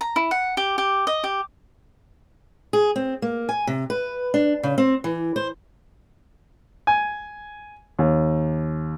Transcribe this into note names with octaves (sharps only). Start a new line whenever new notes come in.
A#5
E4
F#5
G4
G4
D#5
G4
G#4
C4
A#3
G#5
C3
B4
D4
C#3
C4
E3
C5
G#5
D#2